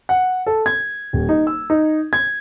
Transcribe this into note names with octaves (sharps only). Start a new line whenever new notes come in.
F#5
A4
G#6
D#1
D#4
E6
D#4
G#6